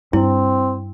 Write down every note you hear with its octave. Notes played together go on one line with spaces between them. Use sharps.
G2 C4 E4